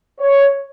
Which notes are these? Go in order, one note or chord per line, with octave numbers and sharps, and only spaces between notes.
C#5